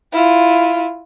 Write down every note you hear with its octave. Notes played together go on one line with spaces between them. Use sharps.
E4 F4